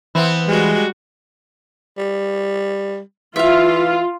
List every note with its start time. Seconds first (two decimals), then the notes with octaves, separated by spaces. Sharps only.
0.15 E3 B3 C4 E4
0.47 G3 G#3 F#4
1.98 G3
3.36 E3 F4 E5 F5